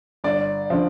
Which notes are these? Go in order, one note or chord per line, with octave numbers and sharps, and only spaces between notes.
G1 D5
D3 F3